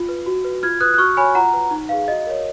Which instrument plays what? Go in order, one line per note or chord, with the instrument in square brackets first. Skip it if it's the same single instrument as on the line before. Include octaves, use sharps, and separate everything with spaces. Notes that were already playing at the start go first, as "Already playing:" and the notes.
Already playing: [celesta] F4
B4
F#4
B4
F4 F6 G#6
B4 D#6 F#6
F#6
F#4 C#6 F6
C#5 G#5 B5
F4 F#5 A#5
B4
D#4
G#4 B4 F5
F#4 D#5
A#4 C#5